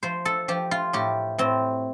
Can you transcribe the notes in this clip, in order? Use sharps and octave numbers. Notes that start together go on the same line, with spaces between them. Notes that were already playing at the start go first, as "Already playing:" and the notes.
F3 C5
A4
F3 G4
F4
A2 G4
A2 C4